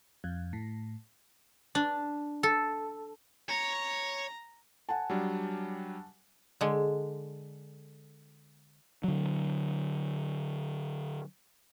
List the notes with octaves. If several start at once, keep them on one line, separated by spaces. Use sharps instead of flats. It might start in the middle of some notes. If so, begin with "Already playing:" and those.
F2
A2
D4
A4
C#5 A#5
F#5 G#5 A5
F#3 G3 D4
D3 G#3
D3 F#3